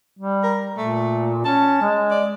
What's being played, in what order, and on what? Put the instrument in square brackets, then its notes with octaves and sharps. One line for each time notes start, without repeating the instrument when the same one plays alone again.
[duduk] G3
[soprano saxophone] A#4
[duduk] A#2 [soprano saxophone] A3
[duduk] C#4 [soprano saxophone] A5
[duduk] G#3
[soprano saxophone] D5